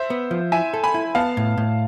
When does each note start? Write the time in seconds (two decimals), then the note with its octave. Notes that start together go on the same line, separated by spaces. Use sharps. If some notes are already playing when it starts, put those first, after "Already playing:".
Already playing: C5 E5
0.10 B3
0.31 F3
0.52 E4 E5 G#5
0.74 A4
0.84 G#5 B5
0.94 E4
1.15 B3 F5 A5
1.37 A2
1.58 A2